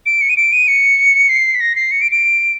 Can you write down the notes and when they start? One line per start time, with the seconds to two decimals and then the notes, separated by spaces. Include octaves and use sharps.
0.06 D7
0.21 C#7
0.29 D#7
0.37 D7
0.53 D#7
0.68 C#7
1.29 C7
1.55 B6
1.60 A#6
1.76 C7
1.91 C#7
2.01 D7
2.12 D7